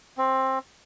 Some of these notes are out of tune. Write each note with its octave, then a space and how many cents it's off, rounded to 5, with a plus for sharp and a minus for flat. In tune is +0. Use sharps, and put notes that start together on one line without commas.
C4 +15